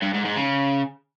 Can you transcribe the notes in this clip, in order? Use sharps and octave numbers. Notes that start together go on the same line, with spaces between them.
G2
G#2
G#2
C#3